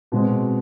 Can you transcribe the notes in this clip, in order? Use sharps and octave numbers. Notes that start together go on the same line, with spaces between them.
B2 G#3 C4